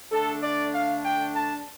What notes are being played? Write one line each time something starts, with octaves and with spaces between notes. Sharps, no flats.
D3 A3 D4 A4
D5
F5
G5
A5